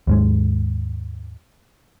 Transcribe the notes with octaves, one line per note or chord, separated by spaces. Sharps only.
D#2 G#2 G#3